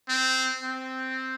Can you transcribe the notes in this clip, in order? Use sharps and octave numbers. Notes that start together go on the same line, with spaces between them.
C4
C4